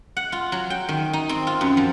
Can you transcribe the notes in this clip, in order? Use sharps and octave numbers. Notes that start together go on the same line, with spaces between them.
F#5
F4
F#3
G5
D#3
D#4
C4
F4
F#2
F3